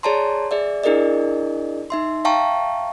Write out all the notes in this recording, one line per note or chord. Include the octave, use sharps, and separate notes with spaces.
G#4 C#5 D5 A5 A#5 C6
G#4 D5 E5
D4 E4 G#4 A#4 D5 D#5
D#4 E5 C6
E5 F5 G5 A5 A#5 C#6